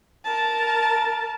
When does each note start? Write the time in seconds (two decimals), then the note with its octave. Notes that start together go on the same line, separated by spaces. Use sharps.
0.25 A#4 A5